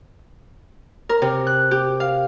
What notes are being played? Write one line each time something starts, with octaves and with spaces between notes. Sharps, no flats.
A#4
C3
F#6
G4
F5